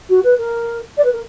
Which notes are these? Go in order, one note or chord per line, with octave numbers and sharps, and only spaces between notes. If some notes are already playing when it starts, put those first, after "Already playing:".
F#4
B4
A#4
D5
B4
A#4